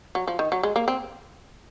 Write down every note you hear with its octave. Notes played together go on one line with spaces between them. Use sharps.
F#3
F3
D#3
F#3
G#3
A#3
C4